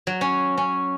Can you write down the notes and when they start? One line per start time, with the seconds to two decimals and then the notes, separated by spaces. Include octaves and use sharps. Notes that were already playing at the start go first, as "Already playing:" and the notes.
0.07 F#3
0.21 C#4
0.57 C#4